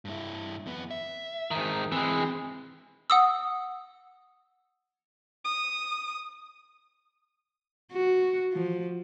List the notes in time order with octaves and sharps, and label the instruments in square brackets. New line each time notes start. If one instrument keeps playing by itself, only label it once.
[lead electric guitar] G2 E4
F2 B3
E5
[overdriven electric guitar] G#2 D#3
[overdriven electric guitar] E3 G#3 [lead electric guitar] C4
[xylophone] F#5 D#6 E6
[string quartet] D#6
[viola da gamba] F#4
F3